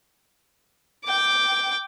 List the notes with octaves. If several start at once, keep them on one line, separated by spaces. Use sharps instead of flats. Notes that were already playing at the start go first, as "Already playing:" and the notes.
G5 D6